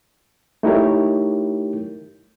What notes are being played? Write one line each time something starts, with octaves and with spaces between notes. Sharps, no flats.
A3 D#4 E4 G4 A#4 C#5